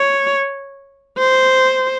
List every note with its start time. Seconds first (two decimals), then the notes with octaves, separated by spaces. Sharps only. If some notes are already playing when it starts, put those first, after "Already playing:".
Already playing: C#5
1.18 C5